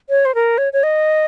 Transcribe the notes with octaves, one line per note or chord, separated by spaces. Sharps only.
C#5
C5
A#4
C#5
C#5
D#5